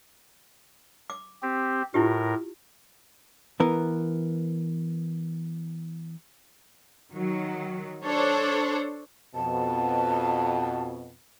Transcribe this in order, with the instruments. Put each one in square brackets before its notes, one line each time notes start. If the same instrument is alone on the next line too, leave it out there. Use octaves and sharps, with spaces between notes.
[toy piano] D6
[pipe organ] C4 G4
[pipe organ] A2 A#4 [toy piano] E4 F4 G4
[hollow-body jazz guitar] E3 B3 A#4
[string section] D#3 F#3
D4 A4 C5 C#5
[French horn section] F2 B2 [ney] A5